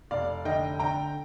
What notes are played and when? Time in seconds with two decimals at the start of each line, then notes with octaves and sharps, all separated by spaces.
0.11 F1 D5 F5
0.45 D3 D#5 G5
0.79 D3 G5 A#5